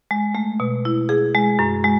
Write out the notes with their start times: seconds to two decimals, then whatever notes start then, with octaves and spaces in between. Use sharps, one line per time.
0.11 G#3
0.35 A3
0.60 B2
0.85 E4
1.09 G#4
1.35 G#3
1.59 F#2
1.84 G#3